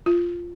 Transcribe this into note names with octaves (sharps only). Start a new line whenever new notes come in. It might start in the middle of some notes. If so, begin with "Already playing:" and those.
F4